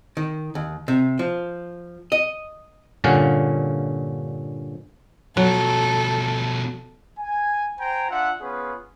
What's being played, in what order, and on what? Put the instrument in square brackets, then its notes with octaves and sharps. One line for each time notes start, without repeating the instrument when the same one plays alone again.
[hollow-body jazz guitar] D#3
D#2
C3
F3
D#5
[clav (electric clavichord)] G2 A#2 D3 C#4 F5 F#5
[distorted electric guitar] B2 F3 [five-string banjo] F#3 [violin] A4
[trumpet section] G#5
C5 G5 G#5 A#5
D4 F4 E5 F#5
B3 C#4 F4 G#4 B4